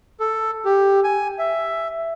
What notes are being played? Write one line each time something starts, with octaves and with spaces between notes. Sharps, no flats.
A4
G4
G#5
E5